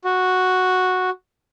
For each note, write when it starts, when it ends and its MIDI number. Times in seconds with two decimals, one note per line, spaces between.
0.04 1.10 66